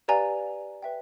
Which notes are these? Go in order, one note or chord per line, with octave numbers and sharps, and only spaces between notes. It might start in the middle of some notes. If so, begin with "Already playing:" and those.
G4 B4 D5 F5 G#5 A#5
B4 E5 G5